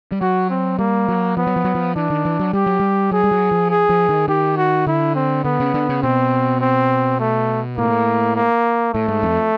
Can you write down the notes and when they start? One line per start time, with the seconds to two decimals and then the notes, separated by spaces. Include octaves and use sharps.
0.12 G3
0.21 F#3 F#4
0.50 C4
0.79 G3 A#3
1.09 F#3
1.37 F3 B3
1.47 F#3
1.56 F3
1.65 F#3
1.75 F3
1.96 E3 D4
2.10 D#3
2.25 E3
2.40 F#3
2.53 G3 G4
2.66 F#3
2.80 G3
3.11 F#3 G#4
3.24 G3
3.31 F#3
3.51 F3
3.70 G#4
3.90 F3
4.09 D#3
4.28 D#3 G4
4.57 F#4
4.87 D3 E4
5.15 C4
5.44 D3 B3
5.60 C#3
5.74 D3
5.89 C#3
6.03 B2 C4
6.61 C4
7.20 A3
7.78 A2 A#3
8.36 A#3
8.94 A2 A3
9.08 G#2
9.23 F2